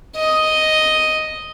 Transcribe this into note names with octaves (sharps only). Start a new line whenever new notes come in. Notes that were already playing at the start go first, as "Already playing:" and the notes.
D#5